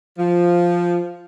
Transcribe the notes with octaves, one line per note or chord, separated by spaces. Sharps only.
F3